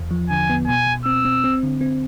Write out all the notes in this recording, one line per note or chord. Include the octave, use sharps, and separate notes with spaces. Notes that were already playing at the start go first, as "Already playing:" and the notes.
Already playing: E2
F3
D3 G#5
B3
B2 G#5
B2
C4 E6
C4
C4
D3
C4